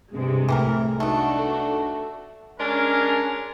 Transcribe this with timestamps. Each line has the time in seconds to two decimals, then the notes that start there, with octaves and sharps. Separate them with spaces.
0.13 G2 C3 G#3
0.49 C2 A2 E3 A3 G4 A#4
1.00 A3 B3 D4 D#4 F#4
1.39 A4
2.59 G#3 C#4 D4 A#4